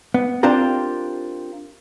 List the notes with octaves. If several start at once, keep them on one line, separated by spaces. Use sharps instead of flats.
B3
C4 D4 F4 G4 A#4